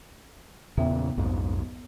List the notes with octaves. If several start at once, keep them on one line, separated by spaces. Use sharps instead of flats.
E2 A#2 C#3 B3 E5 G5
B1 F2 G#2